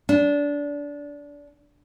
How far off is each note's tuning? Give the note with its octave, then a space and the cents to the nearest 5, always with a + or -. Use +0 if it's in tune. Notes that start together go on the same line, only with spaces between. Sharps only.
D4 -20